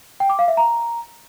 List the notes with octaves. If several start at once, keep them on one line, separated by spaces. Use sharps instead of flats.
G5
D6
F5
E5
A#5